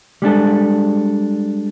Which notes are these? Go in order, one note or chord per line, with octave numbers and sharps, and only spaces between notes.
G3 G#3 D4 A4